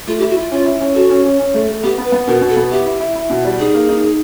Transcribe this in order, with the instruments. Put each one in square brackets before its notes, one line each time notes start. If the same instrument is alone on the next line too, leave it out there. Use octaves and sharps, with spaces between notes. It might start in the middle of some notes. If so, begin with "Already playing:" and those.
[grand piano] A3 [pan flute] F4
[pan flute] G4
[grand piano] E4
[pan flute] F#4
[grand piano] E4 [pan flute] F4
[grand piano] C#4 [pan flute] F4
[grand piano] E4
C#4
[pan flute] F#4 [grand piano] A4
[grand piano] C#4
C#4
C#4
A3
A3
[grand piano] B3 [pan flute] G4
[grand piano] B3
[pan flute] B4
[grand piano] B3
[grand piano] B2 [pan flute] A#4
[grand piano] B2
[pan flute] A4
[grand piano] B3
[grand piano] E4 [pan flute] G4
[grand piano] E4
E4
E4
B2
G3
[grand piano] D#4 [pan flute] G#4
[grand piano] A#3
D#4
D#4